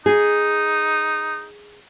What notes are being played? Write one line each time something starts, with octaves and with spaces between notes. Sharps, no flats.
D#4 G#4